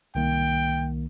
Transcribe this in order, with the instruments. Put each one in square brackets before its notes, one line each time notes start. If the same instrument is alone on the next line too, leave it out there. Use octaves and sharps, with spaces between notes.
[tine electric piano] C2 D#3 A#3 [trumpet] G5